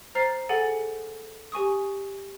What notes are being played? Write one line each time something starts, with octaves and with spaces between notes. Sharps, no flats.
C5 A#5 F6 A6 C7
G#4 A4 F#5 G#5 A6
G4 G#5 C#6 D#6